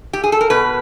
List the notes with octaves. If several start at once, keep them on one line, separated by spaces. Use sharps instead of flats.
G4
G#4
A4
A#4
B2 B4